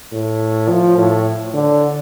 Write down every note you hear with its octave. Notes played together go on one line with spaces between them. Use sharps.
A2
F3
A2
D3